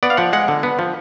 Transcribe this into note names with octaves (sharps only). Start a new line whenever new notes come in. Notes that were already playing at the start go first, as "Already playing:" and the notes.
B3 D5
F5
F3 F#5
G#3 F#5
D3
B3
F3